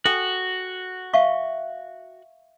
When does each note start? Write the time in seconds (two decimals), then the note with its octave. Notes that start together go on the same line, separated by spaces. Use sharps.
0.05 F#4 A4 G5 G#5
1.13 E5 F5 C#6